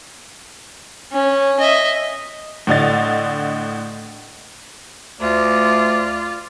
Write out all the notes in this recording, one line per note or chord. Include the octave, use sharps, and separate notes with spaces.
C#4
D#5 E5
A2 D3 D#5 A6
D2 F4 D5